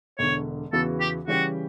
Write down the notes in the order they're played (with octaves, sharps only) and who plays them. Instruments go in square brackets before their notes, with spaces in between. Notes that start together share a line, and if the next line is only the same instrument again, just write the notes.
[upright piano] E1 E2 D3 [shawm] C#5
[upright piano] E2 C#3 E3 B3 F#4 [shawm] A4
[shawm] G4
[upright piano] C#3 E3 G3 C#4 G4 [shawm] F#4